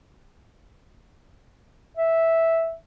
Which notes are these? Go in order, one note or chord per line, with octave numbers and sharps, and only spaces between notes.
E5